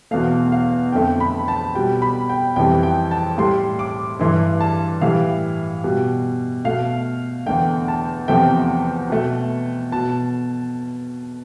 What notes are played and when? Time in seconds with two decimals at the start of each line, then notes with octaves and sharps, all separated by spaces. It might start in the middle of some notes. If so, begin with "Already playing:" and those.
0.11 E2 B2 A3 F5
0.52 F5
0.92 F2 D3 A3 G5
1.20 B5
1.48 A5
1.75 B2 G3 G5
2.02 B5
2.30 G5
2.56 F2 E3 G3 G5
2.83 G5
3.11 A5
3.38 A2 G3 C6
3.79 D6
4.19 G2 E3 A3 C6
4.61 A5
5.01 A2 E3 G3 F5
5.84 B2 G3
6.65 B2 A3 F5
7.46 E2 D3 A3 G5
7.88 A5
8.28 E2 C3 F3 A3 G5
9.10 B2 A3
9.92 B2 A5